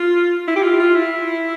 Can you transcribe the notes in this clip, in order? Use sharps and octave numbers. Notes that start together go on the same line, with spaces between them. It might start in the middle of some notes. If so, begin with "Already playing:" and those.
Already playing: F4
E4
G4
F4
F4
E4